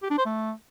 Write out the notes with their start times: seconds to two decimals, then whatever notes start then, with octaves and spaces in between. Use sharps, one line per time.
0.02 G4
0.10 D4
0.18 C5
0.25 A3